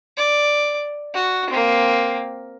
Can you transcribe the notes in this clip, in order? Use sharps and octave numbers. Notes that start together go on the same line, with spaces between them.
D5
F#4
A#3 C4